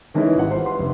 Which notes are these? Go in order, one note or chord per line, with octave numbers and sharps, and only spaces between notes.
D#3 E3 G#3 C#4 D#4 E4
G#1 G3 F4 F#5
C5
B4 C6
F1